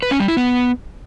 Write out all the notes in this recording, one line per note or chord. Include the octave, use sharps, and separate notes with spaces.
B4
C#4
G3
E4
B3